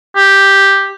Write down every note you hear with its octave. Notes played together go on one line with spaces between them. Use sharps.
G4